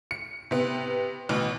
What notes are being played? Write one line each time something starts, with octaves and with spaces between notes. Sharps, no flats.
C#7
C3 B3
A1 B2